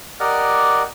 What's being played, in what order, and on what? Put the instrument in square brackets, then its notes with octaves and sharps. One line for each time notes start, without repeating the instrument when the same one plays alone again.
[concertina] G4 A#4 D5 D#5 F#5 F6